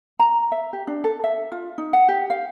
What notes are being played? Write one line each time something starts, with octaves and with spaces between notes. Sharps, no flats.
A#5
E5
G4
D4
A4
E5
F4
D#4
F#5
G4
F5